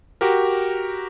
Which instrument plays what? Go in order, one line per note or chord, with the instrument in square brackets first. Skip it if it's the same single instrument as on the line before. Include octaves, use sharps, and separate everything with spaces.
[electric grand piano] F#4 G4 A#4